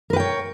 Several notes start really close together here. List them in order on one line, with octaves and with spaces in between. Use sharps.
A#4 B4 G5 C#5